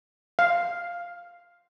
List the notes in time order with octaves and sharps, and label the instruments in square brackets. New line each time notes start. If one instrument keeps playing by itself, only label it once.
[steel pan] F5